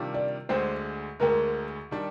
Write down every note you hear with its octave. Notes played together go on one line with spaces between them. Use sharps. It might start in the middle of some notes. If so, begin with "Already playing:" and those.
Already playing: C3 D#3 G3 D4 F4
D5
D2 D3 G#3 C5
D2 D3 G#3 A#4
D#3 G3 D4